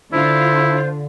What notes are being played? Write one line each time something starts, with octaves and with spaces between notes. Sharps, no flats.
D3 D4 E4 F4 C5